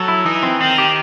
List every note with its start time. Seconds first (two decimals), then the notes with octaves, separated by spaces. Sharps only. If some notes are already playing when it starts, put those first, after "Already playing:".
Already playing: F#3 A4
0.08 E4
0.25 E3 D#4
0.43 C4
0.61 D#3 C4
0.78 G4